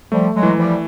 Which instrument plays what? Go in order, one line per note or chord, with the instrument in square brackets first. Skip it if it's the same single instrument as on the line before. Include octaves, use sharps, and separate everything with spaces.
[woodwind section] F3 G3 [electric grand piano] A3
[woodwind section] F#3 G#3
[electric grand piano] E3
[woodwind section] F3 G3